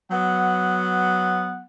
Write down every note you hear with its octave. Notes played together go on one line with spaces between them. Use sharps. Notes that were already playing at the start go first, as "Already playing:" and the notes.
F#3 B3 F#5